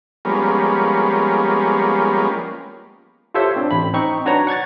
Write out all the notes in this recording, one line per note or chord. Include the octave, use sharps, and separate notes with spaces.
F3 G3 G#3 A#3 B3 C#4
F4 G4 A4 C5 C#5 E5
C4 D4
A1 B5
C4 D#4 C#6
D4 F#4 B4 C#5 A#5
F#5 C#6 G#6 A6